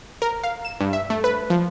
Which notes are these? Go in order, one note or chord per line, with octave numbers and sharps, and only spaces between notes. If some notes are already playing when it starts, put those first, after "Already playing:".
A#4
F5
E7
G2
E5
A3
B4
F3